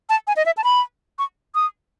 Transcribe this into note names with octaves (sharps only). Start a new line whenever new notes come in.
A5
G#5
D#5
E5
A5
B5
C#6
D#6